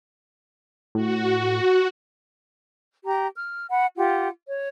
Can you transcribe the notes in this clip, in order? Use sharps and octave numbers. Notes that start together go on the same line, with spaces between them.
A2 F#4
G4 A#5
F6
F#5 B5
F4 G4 F#5
C#5